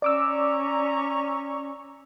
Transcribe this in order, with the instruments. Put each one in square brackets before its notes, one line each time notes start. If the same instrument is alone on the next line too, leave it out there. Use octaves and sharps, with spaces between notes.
[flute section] C#4 A#5 C#6 [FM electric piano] D5 D6 E6